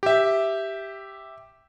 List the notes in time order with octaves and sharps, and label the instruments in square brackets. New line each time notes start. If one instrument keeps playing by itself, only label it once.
[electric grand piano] G4 E5